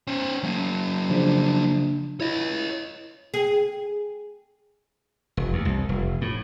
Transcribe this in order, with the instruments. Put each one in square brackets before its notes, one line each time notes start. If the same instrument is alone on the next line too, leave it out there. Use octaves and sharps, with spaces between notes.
[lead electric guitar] C#4 C5
F#3 A#3
[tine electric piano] C#3 F3 D4
[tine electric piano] E4 [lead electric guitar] C#5 D#5
[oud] G#4
[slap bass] F1
D#2
C2
F1
A2